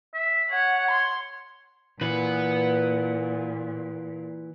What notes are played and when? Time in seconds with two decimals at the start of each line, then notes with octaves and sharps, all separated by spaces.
0.14 E5
0.51 C#5 F#5
0.91 C6
2.01 A#2 E3 B4 F#5